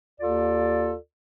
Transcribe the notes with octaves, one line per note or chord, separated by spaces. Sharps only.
D#2 F4 A4 D5